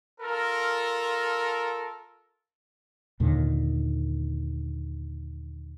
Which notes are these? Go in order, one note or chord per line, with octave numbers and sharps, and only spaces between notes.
F4 A4 A#4
D#2 A#2 D3 D#3